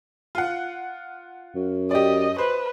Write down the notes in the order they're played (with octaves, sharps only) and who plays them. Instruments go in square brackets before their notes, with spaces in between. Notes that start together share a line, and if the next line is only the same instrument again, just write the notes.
[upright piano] F4 F#5
[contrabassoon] F#2
[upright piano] G4 D5 [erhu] D#5
[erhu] B4 [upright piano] C5